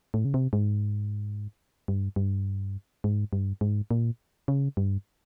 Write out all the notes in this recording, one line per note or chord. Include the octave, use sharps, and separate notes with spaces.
A2
C#3
C3
G#2
G2
G2
G#2
G2
G#2
A#2
C#3
G2